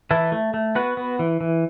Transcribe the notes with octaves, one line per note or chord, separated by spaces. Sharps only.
E3 E4 A4
A3
A3
B3 F#4 B4
B3
E3
E3